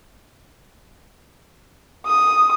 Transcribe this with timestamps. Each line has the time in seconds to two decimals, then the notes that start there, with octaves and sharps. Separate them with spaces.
2.06 D#6